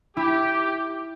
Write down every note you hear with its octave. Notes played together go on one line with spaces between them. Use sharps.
E4 G4